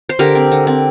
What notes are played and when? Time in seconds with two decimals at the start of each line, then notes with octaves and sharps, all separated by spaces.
0.09 C5
0.19 D3 G4 A#4
0.35 C4
0.52 D3
0.67 C4